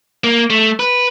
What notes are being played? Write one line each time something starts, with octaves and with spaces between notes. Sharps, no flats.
A#3
A3
B4